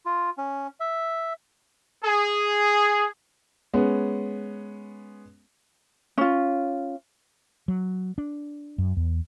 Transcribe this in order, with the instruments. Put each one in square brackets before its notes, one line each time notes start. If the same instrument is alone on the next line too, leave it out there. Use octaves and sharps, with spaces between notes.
[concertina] F4
C#4
E5
[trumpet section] G#4
[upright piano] G#3 B3 C#4
[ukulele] C#4 F4
[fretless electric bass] F#3
D4
F#2
E2